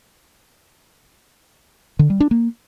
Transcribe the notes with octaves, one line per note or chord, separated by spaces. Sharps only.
D3
G3
D4
A#3